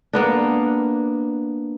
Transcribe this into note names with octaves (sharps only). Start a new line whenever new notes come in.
A#3 B3 D4